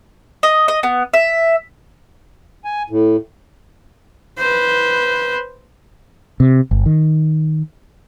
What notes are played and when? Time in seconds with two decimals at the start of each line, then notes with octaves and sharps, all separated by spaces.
0.43 D#5
0.68 D#5
0.83 B3
1.14 E5
2.65 G#5
2.90 A2
4.39 B4 C5
6.40 C3
6.71 G1
6.86 D#3